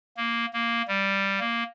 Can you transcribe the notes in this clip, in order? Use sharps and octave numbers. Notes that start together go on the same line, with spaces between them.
A#3
A#3
G3
A#3